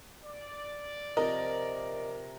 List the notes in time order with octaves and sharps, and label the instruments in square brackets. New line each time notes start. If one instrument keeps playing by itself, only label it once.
[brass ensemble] D5
[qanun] C3 F3 [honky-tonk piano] A#4 [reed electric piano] D#5